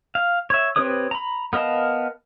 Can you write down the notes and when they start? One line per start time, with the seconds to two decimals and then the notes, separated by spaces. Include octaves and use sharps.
0.15 F5
0.50 C#5 E5
0.76 C4 G4 B4 C#5 D#6
1.11 A#5 B5
1.53 B3 A#4 D#5 F5 A5